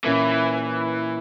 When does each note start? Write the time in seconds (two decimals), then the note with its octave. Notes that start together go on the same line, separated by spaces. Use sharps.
0.04 A#2 E3 A#3 C#4